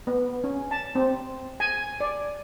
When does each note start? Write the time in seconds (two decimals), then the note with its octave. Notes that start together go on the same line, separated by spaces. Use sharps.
0.07 B3
0.44 C#4
0.71 A5
0.95 C4
1.60 G#5
2.00 D5